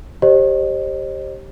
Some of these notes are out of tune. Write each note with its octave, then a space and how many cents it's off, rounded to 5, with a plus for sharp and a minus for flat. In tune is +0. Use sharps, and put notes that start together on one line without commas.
G4 +0 C5 +35 D#5 -35